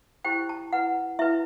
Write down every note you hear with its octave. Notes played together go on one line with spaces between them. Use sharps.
E4 G4 C5 G5
A5
E4 B4 F#5
E4 B4 E5